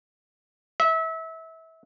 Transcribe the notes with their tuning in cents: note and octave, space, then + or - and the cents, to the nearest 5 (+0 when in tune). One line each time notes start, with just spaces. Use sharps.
E5 -25